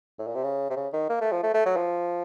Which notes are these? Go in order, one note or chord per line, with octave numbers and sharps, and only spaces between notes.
A2
A#2
C3
C#3
C3
C#3
D#3
A#3
A3
F3
A3
A3
F#3
F3